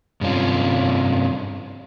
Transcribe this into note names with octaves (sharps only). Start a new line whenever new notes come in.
G2 C3 C#4 F4